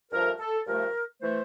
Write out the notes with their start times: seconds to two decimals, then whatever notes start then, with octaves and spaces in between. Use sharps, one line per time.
0.12 G2 F3 A3 A#4
0.40 A4
0.67 G2 F3 A3 A#4
1.21 E3 A3 C5